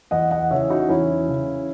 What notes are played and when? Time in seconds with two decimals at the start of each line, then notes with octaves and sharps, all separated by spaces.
0.11 E2 D#5 F#5
0.31 D#5 F#5
0.51 C#3 E3 C#5 E5
0.70 D#4 F#4
0.89 E2 C#4 E4
1.29 C#3 E3